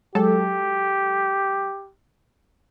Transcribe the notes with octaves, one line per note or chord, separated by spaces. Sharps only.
F#3 G#3 G4 A4